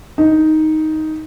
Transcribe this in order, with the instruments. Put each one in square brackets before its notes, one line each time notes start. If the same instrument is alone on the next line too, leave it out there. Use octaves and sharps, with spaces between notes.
[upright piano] D#4